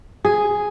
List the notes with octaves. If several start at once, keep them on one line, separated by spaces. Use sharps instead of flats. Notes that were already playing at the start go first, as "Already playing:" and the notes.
G#4